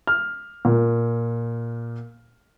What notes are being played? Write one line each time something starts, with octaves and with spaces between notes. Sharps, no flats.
F6
A#2